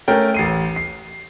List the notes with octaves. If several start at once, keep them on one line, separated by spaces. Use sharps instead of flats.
A3 C#4 A#4 G5
A1 C7 D#7
C7